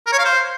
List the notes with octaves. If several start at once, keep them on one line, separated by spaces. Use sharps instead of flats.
A#4
C#5
F5
C5